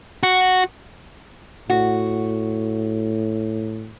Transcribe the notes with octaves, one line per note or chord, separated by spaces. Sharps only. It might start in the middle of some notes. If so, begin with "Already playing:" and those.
F#4
A2 F#4